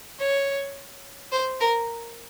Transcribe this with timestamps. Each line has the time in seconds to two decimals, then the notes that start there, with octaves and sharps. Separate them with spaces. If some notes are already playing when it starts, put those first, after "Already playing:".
0.20 C#5
1.32 C5
1.61 A#4